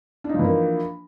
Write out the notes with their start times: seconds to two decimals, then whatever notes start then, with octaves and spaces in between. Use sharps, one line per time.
0.24 D4
0.29 D#4
0.34 F3
0.39 E3
0.44 A#3